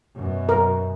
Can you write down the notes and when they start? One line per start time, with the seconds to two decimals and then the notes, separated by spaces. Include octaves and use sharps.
0.15 F#2 B2
0.49 A#4